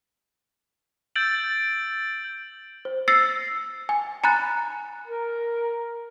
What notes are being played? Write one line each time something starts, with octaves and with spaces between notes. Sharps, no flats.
E6 G6 A6 D7 F#7
C5
E6 A6 A#6 C7 C#7
G#5
G#5 A#5 B5 F#6 A6
A#4